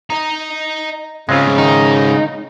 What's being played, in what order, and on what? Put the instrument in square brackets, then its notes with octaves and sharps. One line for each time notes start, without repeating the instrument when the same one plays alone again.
[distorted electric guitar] D#5 A#5
[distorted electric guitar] G#2 C#4 [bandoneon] C#3 [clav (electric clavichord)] G#3 C4 F4
[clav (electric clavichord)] D#3 [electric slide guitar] D#4